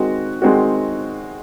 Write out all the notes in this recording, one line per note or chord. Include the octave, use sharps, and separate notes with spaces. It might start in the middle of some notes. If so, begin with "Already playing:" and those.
Already playing: D#3 G#3 C4 F#4
D#3 G#3 C4 F#4